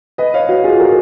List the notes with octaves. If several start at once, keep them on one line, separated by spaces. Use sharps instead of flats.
B4 D#5
C#5 F5
F#4
F4 G#4
F#4 A#4